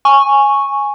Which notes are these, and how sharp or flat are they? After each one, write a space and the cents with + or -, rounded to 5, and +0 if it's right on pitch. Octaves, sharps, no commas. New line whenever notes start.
G#5 +0 C#6 -5